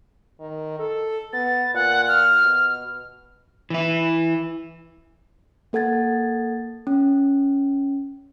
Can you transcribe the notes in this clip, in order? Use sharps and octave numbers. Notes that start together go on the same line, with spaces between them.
D#3
A4
B3 A6
A#2 F#5
F6
B2
E3 E4
A#3 A4 F#5 G#6 A6
C#4